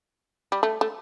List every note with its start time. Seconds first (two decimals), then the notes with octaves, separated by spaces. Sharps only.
0.52 G3
0.63 A3
0.81 A3